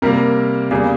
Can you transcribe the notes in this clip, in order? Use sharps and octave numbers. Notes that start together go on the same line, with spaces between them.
C3 G3 A#3 A#4
E2 C#3 G3 A#3 G#4